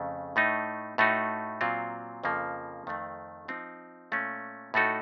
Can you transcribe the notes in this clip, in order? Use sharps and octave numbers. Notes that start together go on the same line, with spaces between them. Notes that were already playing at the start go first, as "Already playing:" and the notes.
Already playing: F2 C#3 A3 C#4
A2 A3 D#4
A2 A3 D#4 F#4
A#2 F#3 C4 F4
F2 C#3 F3 A#3
F2 D#3 A3 C4
F3 C4 D#4
A#2 A3 C#4
A2 A3 D#4 F#4 A4